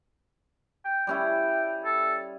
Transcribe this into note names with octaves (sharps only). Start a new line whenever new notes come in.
G5
G3 C#4 E4 G5
A4